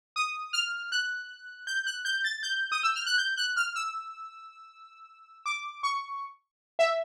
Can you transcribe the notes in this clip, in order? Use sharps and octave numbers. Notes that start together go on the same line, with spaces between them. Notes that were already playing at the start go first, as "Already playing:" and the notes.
D#6
F6
F#6
G6
F#6
G6
A6
G6
D#6
E6
F6
F#6
G6
F#6
F6
E6
D6
C#6
E5